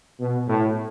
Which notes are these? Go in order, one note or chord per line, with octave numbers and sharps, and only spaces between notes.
B2
A2